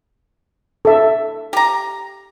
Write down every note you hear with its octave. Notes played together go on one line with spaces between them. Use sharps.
A4 E5
G4 A#5